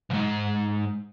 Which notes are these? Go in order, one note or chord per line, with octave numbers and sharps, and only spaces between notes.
B1 G#2